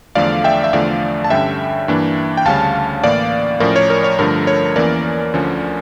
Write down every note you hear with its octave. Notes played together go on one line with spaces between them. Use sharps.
E2 D3 F3 A3 D5 F5
E5 G5
E5
E2 D3 F3 A3 D5 F5
A5
G2 D3 G3 C#4 E5 G5
G2 E3 A#3 D4
G5
D2 C#3 G3 C#4 F5 A5
A2 E3 A#3 D5 F5
A2 F3 C#4 A#4 D5
C#5
A#4
C#5
G2 D3 F3 A3 A#4
C#5
E2 E3 A#3 C#4 A#4 D5
D2 D3 F3 C#4